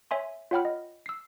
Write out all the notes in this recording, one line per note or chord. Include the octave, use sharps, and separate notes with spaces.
C#5 E5 G#5 C6
F4 C#5 F#5 G5 B5 F6
D#5
E6 C7